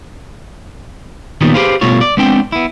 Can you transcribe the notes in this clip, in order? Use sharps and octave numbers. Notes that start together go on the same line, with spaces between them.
A#2 D#3 G3 B3
G4 G#4 B4 C5 F5
B2 G3 A3 F4 C#5
D5
G#3 B3 C4 D4 G5
B3 E4